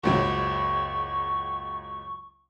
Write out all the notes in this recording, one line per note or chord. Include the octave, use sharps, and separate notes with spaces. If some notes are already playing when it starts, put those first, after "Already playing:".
F#1 C#2 F#3 C#6